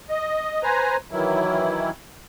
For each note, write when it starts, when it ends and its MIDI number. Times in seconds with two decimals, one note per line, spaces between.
0.09 0.63 75
0.63 0.97 71
0.63 0.97 72
0.63 0.97 80
0.63 0.97 82
1.11 1.90 51
1.11 1.90 52
1.11 1.90 54
1.11 1.90 64